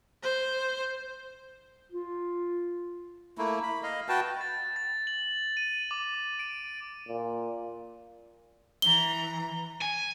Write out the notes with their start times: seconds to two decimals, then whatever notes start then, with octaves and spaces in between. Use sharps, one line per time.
0.23 C5
1.92 F4
3.38 A3 A#3 E4
3.63 B5
3.83 D#5 F5
4.09 F#4 B4 G5 A5
4.41 A6
4.76 A6
5.07 F#7
5.57 D#7
5.91 D6
6.39 D7
7.08 A#2
8.82 E3 A#5 G7
9.82 G#5